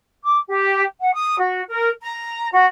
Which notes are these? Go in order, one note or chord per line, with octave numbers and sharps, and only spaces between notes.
D6
G4
F#5
D#6
F#4
A#4
A#5
F#4